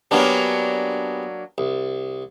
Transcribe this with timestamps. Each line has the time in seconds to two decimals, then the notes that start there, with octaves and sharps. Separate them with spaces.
0.11 F#3 G3 A#3 B3 C#4 D4
1.58 C2